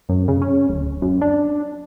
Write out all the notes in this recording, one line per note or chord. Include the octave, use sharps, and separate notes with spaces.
F#2
C#3
C#4
D1
F#2
D4